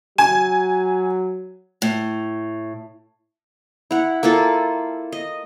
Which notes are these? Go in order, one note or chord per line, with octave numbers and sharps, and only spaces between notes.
F#3 G#5
A2
E4 F#5
A#3 E4 F4 A4
D#5